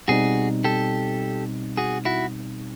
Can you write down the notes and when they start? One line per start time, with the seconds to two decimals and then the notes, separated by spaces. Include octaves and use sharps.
0.08 B2 G3 C4 D#4 F#4 G#4
0.64 G4 A4
1.77 F#4 G#4
2.05 E4 F#4